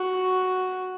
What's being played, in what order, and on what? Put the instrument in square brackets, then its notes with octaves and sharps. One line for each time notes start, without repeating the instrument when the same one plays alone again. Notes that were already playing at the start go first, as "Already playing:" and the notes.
Already playing: [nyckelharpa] F#4